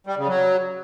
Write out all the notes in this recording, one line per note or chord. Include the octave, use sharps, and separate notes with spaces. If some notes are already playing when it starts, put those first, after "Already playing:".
G3
C#3
F#3